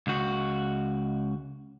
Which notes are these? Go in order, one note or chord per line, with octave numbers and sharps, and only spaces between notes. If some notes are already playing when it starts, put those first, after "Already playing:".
C#2 F#4